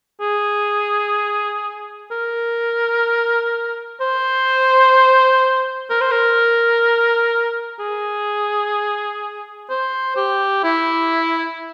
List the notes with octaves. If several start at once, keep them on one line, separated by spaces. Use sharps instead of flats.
G#4
A#4
C5
A#4
C5
A#4
G#4
C5
G4
E4